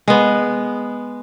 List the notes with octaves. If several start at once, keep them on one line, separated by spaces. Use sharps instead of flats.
G#3 B3